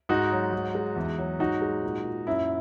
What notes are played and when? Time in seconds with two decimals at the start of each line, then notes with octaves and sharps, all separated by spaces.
0.09 G#2 D#4 F#4
0.32 F#3
0.53 G#2
0.75 G#3
0.96 E2
1.18 F#3
1.40 G#2 D#4 F#4
1.62 G#3
1.83 A#2
2.05 A#2
2.27 F#2 E4